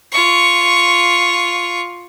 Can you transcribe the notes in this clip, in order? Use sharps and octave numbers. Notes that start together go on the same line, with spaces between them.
F4 C#6